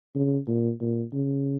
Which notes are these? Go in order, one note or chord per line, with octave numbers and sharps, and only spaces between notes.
C#3
A#2
A#2
C#3